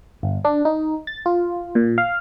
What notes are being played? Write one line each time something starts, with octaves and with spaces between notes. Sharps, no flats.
G1
D4
D#4
A6
F4
A#2
F5